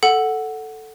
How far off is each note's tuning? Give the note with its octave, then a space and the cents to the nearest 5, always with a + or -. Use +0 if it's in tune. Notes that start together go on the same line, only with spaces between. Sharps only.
A4 +0 F#5 +0